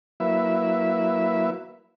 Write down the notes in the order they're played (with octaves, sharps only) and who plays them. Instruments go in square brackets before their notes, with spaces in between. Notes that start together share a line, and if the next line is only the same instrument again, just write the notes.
[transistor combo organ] F#3 A#3 E4 B4 E5